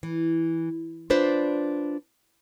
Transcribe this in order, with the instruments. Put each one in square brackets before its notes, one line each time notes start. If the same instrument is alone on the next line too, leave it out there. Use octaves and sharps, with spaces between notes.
[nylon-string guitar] E3
D4 F4 B4 C5 D5